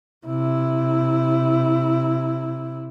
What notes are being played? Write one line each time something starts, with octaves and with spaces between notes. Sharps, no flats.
C3 E4